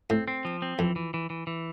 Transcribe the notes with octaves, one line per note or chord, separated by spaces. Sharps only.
A2 C4
C4
F3
C4
F2 E3
E3
E3
E3
E3